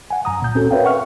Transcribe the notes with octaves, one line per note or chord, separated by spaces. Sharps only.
F#5 G#5
F#2 A#5 D#6
C#2 A#2 G6
C4 C#4 F#4 A4
A#4 B4 C#5 E5 F5 G5
F#5 C#6 F6